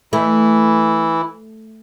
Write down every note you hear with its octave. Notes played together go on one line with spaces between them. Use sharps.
E3 A3 E4